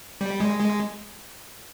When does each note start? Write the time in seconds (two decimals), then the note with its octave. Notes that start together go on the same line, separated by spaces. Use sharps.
0.21 G3
0.40 G#3
0.60 G#3